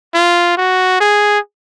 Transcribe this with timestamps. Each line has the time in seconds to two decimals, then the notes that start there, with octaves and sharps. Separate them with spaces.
0.15 F4
0.58 F#4
1.01 G#4